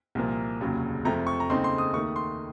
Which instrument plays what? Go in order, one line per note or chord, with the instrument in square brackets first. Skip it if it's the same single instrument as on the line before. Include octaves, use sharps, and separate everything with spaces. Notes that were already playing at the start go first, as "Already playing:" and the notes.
[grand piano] C2 A#2 F3 A#3
F1 D#2 C#3 F#3
F2 C3 F3 A3 A#5
C#6
A#5
D#2 C#3 A3 C4 D#4 C6
C6
D#6
D#2 D#3 A3 C#6
C6